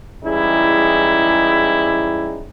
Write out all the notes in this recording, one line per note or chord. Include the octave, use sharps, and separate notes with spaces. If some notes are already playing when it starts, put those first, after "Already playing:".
G#2 C#3 E3 G3 D#4 E4